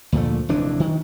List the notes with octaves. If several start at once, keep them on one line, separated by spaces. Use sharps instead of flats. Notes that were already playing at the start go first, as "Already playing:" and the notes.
D2 A#2 F3 A3
F1 D#2 E3 D4
D#3